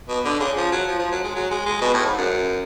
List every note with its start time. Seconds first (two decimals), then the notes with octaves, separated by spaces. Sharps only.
0.09 B2
0.25 D3
0.40 C#3
0.56 F3
0.72 F#3
0.88 F3
0.99 F3
1.12 F#3
1.23 G#3
1.35 F#3
1.51 G#3
1.66 G#3
1.82 B2
1.94 A2
2.06 G#2
2.18 F#2